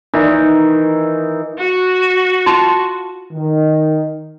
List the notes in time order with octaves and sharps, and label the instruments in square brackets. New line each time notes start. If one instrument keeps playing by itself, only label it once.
[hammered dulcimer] D#3 E3 D#4 E4
[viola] F#4
[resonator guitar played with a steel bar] F4 A5
[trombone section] D#3